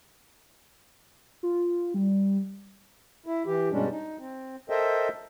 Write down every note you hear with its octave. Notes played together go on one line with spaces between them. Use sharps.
F4
G3
E4
E3 G4
G2 B2 G3 G#3 C#4 D4
D#4
C4
A4 A#4 C5 D#5 E5 G5